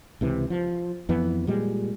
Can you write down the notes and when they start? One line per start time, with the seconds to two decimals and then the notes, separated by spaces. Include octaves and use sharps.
0.21 C#2 C3 E3
0.50 F3
1.09 F2 E3 B3
1.47 A#2 G3 G#3